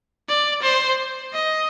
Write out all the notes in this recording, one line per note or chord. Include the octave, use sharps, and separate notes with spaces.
D5
C5
D#5